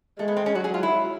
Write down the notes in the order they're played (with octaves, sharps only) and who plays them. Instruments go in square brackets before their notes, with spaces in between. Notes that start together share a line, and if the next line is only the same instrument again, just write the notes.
[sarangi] G#3 [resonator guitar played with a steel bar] A3
[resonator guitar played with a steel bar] B3
C4
C#4
[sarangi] F#3 [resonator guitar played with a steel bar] F#4
[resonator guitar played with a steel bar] G#4
F4
E4